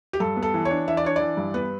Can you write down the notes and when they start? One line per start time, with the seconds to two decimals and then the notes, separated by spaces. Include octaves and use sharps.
0.13 G4
0.20 G2 A4
0.36 B3
0.43 A4
0.54 E3
0.65 C#5
0.71 D4
0.88 E3 E5
0.97 D5
1.04 D4 C#5
1.16 E3 D5
1.37 G2
1.54 B3 B4